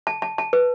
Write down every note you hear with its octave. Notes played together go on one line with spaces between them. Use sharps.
A5
A5
A5
B4